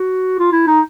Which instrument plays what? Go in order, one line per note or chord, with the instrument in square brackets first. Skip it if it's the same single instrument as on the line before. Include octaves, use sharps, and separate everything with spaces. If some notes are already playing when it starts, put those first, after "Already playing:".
Already playing: [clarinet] F#4
F4
E4
D#4